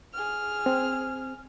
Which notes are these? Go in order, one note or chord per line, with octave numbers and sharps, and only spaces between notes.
G#4 F6
C4